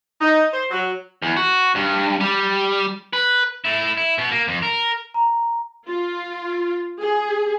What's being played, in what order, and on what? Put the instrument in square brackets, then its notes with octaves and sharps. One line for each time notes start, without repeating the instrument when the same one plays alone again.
[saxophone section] D#4
C5
F#3
[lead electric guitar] E2
F#4
G2
G3
B4
[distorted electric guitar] A3 E4
E4
B2 B3
A#3
F2
A#4
[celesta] A#5
[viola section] F4
G#4